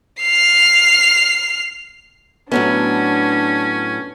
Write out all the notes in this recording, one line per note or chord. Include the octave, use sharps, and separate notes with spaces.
F6 C7
A2 F#3 B3 C#4 D4